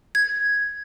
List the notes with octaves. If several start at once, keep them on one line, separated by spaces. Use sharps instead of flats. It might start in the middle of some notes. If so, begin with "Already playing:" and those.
G#6